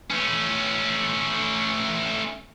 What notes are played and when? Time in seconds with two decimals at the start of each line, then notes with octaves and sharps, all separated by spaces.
0.10 A3 C#4